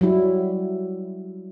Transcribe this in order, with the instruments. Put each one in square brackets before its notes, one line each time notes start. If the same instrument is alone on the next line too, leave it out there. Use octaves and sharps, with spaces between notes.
[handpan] F#3 G3 E4